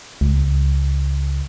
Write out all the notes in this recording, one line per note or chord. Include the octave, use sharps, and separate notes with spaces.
C#2